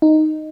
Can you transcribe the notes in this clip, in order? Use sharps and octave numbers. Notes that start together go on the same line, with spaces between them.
D#4